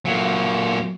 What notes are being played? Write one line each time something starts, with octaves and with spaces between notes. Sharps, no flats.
A#2 F#3